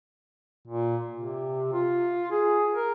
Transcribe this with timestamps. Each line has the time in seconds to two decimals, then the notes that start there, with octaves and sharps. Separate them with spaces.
0.68 A#2
1.15 C3
1.73 F4
2.31 G#4
2.73 A#4